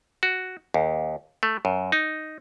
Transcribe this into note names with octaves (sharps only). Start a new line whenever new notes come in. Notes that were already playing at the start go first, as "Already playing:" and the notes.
F#4
D#2
A3
F#2
D#4